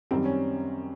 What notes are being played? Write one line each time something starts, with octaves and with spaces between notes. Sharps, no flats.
F#2 D#3 G3 C4
C#4